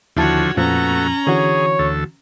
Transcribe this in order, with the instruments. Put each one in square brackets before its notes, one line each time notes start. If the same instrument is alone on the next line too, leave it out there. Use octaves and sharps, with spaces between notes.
[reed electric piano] D#2 E4 A5 [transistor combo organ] D3 F3 [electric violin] F#4 C#5
[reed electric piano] F2 A#2 F3 [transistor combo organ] A3 F#4 [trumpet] B3 [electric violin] C#4 A#5
[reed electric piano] D3 E3 F#4 [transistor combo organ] G#4 [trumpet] C#5
[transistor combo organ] D2 A4